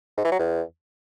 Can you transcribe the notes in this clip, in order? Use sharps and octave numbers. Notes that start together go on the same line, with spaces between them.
G#2
E3
F#3
E2